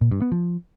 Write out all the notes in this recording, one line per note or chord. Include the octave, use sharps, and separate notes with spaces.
A#2
G2
B3
F3